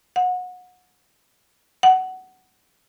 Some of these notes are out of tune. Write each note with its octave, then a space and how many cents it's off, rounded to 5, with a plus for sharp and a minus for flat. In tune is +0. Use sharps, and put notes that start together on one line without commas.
F#5 -25
F#5 +15